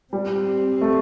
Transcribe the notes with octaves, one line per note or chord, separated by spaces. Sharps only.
G3 C4
A3